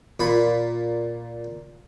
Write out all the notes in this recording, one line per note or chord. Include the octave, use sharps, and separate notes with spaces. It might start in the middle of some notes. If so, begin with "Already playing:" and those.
A#2 B5